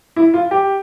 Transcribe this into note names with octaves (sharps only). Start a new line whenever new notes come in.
E4
F4
G4